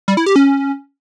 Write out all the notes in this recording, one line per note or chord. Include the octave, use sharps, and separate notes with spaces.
G3
E4
G4
C#4